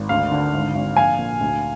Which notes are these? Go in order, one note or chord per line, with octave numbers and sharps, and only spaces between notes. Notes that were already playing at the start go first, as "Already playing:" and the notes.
Already playing: G#1
D2 F5
D3
G#1
G#1
A#1 F5 G#5
A#2
D2